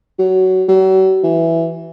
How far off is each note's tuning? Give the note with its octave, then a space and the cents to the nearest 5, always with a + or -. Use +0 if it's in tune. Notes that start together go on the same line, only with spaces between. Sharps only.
F#3 +15
F#3 +40
E3 +5